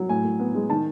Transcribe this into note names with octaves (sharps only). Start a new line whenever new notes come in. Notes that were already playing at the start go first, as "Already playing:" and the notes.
Already playing: F#3
A2 G#5
A2
B3
G#3
D#3 A5